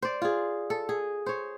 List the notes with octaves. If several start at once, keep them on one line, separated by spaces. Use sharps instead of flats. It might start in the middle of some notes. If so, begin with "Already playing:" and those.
C5 D5
F4 G#4
A4
G#4
C5 C#5